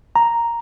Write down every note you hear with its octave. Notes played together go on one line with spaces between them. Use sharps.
A#5